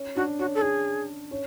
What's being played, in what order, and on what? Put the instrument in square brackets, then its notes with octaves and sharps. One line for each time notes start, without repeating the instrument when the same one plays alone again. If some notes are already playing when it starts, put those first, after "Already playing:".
Already playing: [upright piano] C#4
[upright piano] D4 [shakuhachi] F#4
[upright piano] C#4 [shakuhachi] F#4
[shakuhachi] A4
[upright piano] D4 [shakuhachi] G#4
[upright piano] C#4